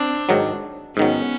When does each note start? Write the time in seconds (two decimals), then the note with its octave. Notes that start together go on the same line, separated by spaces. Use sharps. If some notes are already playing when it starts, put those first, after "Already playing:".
Already playing: C4 D4
0.29 G#2 D#3 F#3
0.97 G#2 D#3 F#3 B3 C#4